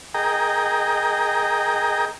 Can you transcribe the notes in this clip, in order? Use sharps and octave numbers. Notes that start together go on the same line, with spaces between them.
G#4 A#4 D#5 G5 A#5